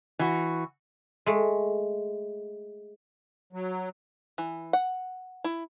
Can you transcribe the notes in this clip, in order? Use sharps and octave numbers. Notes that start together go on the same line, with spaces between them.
E3 F#4
G#3 A3
F#3
E3
F#5
E4